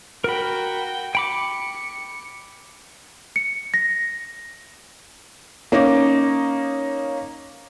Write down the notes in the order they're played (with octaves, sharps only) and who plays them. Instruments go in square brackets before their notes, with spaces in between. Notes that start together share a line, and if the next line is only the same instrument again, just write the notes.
[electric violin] F#4 G5 [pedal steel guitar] A#4 B5
[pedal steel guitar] G5 B5 D6 [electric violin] C#7
[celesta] C#7
A#6
[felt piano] A#3 C#4 D#4 D6